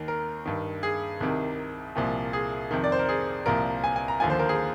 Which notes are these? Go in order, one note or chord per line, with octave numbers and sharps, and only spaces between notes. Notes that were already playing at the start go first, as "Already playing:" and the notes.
Already playing: D#2 D#3
A#4
G2 D#3
G#4
C2 C3 D#3
C2 A#2 F3
G#4
F2 C3 D#3
D5
C5
A#4
G#4
C2 A#2 F3 A#4
G#5
G#5
A#5
D#2 D3 F3 G#5
C5
A#4
G#4